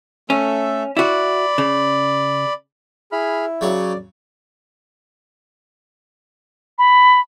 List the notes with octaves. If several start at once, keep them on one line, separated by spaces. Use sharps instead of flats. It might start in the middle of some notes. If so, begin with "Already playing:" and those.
A3 C#4 A4 E5
E4 F#4 D5 B5
C#3
E4 G#4 B5 F6
C#3 F#3 D5 C#6
B5